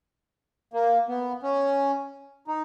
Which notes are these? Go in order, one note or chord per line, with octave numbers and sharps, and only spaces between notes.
A#3
B3
C#4
D#4